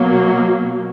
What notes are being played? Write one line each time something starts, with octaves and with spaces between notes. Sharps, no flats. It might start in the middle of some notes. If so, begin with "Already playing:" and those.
Already playing: B2 F#3 A#3